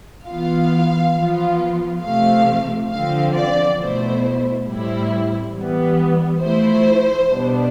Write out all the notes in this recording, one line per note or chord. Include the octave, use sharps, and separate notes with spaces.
E3 B3 F4 F5
F3 B3 F4
C3 F3 A3 F5
D3 F3 C4 F5
D5
B2 A3 E4 C5
A2 G3 C4 E4
E3 G3 B3
F3 A3 E4 C5
B2 G3 B3 D4